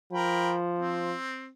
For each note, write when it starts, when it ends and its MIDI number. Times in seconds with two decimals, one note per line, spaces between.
0.13 1.15 53
0.13 0.55 70
0.13 0.55 79
0.13 0.55 83
0.78 1.49 60